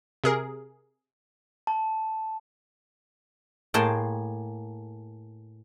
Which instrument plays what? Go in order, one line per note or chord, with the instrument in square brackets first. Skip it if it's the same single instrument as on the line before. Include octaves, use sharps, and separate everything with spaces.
[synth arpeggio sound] C3 G#4 A#4
[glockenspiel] A5
[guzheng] A2 A#3 G#4 G5 A5 C6